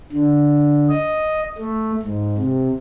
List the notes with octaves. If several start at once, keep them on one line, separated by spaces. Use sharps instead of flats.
D3
D#5
A3
G#2
C3